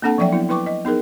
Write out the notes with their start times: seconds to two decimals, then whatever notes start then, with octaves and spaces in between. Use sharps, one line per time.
0.02 A#3 C4 D4 A4 F#5 A5
0.18 F3 F#3 D5 E5 G5
0.33 B3 E4
0.49 E4 B4 G5 C#6 D6
0.66 D#5
0.85 B3 D#4 G#4 A#4